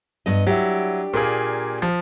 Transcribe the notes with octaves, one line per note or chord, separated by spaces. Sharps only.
G2 B3 D#5
F#3 D4 E4 G4
A#2 A#3 G#4
F3